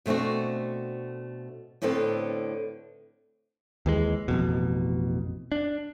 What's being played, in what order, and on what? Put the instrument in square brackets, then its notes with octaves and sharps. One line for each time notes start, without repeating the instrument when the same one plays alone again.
[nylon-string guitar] B2 A3 C4 D4 F#4
A2 D3 B3 C4 A4
[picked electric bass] D#2 E3 G#3
A1 F2 B2
D4